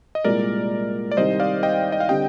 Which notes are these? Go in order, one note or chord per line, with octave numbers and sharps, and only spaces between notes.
D#5
C2 A#2 G#3 A#4 D5
D5
C2 C3 D#3 C5 D#5
D5 F5
D#5 G5
D#5
F5
D3 G3 C4 G4 D#5 G5